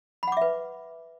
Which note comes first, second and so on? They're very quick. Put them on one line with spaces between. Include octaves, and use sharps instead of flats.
B5 F#5 D6 E5 B4